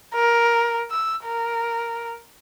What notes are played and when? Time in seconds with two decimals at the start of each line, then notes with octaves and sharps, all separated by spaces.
0.15 A#4
0.91 E6
1.24 A#4